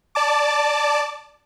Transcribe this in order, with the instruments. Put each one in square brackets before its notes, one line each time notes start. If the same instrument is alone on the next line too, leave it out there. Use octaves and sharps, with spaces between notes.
[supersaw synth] D5 A5 D6